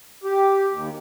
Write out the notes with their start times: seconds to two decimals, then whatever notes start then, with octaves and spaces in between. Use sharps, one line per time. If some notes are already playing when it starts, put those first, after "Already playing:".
0.24 G4
0.72 D#2